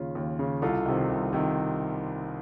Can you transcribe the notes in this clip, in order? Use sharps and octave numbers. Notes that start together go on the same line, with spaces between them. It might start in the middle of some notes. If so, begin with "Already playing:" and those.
Already playing: D#2 C#3 C#4 F4
D#2
C#3
C2 F4 A4
C3 D#3
C2
C3 D#3